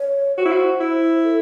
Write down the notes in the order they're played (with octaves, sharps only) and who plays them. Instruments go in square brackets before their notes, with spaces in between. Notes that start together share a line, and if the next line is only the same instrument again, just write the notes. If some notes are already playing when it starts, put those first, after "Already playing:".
Already playing: [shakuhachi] C#5
[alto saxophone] F#4 [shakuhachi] C5
[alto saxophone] E4
F#4
E4
[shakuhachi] A4